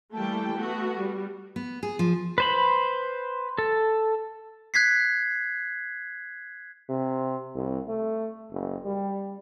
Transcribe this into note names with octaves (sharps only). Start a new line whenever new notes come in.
E3 G3 A3 A#3 G5 A5
A3 B3 F#4
G3
B3
G#4
F3
B4 C5 B5
A4
F#6 G#6 B6 C7
C3
C2
A3
F#1
G3